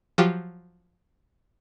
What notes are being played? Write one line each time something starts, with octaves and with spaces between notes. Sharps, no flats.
F3 F#3 F4 G4